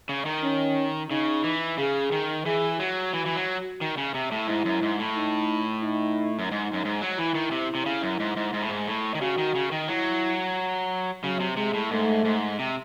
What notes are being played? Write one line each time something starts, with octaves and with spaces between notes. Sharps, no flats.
C#3
D#3
C#4
C#3 D#4
E3
C#3 G#4
D#3
E3 G#4
F#3 F#4
E3
E3
F#3
D#3
C#3
C3
A2
G#2 E4
F#2
G#2
A2
D#4
D#4
F#2
G#2 D#4
F#2
G#2
F#3
E3 E4
D#3
C3
C3
C#3
F#2
G#2
G#2
G#2
A2
G#2
A2
D#3
C#3 F#4
D#3
C#3
D#3
F#3 E4
C#3 F#3
C3
C3 G#3
A2
G#2 A3
G#2
C3